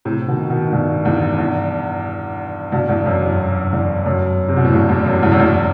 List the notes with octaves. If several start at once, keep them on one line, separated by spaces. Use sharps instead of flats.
A2 C3
B2 D#3
B2 D#3
G2 B2
E2 G2
E2 G2
G2 B2
E2 G2
F#2
E2
E2 G2
F#2
C3
B2
A2
E2 G2
E2 G2
F#2
E2 G2
F#2
E2 G2